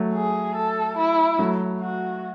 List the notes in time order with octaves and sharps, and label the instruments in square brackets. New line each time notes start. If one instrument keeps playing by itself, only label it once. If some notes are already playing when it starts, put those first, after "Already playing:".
Already playing: [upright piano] F#3 A3
[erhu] G#4
A4
E4
[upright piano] F#3 A3
[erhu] F#4